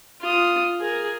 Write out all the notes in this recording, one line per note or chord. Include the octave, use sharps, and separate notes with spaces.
F4 D#6
G#4 A#4